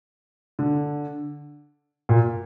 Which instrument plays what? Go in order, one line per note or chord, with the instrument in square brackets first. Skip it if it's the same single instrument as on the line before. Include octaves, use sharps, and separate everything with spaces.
[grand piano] D3
A#2